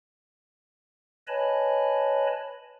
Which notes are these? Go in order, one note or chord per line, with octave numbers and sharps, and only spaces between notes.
B4 C#5 D#5 G#5 A5 B5